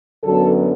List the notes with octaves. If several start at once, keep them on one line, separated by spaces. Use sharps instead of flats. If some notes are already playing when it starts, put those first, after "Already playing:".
F#2 D3 F#3 B3 A4